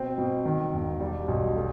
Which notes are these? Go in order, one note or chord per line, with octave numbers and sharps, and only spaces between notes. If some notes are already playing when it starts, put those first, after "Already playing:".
Already playing: B2 C4
B2
D#3
E1
G3
B1
A3